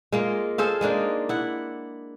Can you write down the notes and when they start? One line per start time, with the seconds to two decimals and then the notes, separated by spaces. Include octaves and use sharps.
0.12 G#3 A#3 F4
0.58 G#4 A4 C5 F5
0.81 G#3 A#3 D4 D#4
1.29 E4 F#5